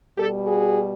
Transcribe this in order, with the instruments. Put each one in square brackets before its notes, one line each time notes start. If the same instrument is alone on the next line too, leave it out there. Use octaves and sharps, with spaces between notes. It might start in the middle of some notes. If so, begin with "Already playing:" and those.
[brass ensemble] B2 G3 G4 A4
F#4 G#4